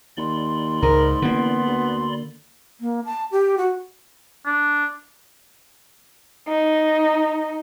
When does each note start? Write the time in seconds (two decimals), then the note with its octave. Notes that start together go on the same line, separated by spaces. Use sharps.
0.17 D#2 D5 B5 C6
0.82 C#2 G#2 A#4
1.22 A1 D3 A#3 B3
1.67 D2
2.81 A#3
3.05 A5
3.31 G4
3.58 F#4
4.46 D4
6.49 D#4